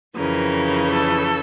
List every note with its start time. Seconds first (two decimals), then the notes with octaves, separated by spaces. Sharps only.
0.16 F2 C#3 E3 A#4
0.91 A4